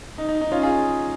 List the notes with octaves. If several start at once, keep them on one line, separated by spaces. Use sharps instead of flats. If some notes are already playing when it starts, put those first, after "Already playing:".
D#4
D#4
D#4
C#4 F4
F4 G#4